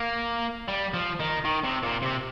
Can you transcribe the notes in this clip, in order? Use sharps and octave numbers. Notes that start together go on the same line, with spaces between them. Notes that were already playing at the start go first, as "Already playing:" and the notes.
Already playing: A#3
G3
F3
D#3
D#3
C3
A#2
C3